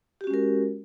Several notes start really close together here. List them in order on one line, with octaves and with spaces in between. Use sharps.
G4 F#4 C#4 G#3 A#4